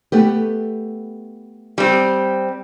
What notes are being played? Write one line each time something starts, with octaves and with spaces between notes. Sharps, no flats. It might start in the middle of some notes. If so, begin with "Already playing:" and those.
A3 B3 G4
G3 C4